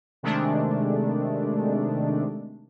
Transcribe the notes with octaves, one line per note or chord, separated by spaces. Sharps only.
C3 D#3 G#3 A3 D4